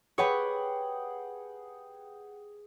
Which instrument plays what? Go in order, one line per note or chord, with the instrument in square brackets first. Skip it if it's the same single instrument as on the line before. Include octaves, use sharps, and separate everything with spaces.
[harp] G4 B4 C#5 [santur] G#4 F#5 G5